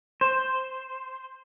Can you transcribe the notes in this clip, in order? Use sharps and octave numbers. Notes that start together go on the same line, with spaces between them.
C5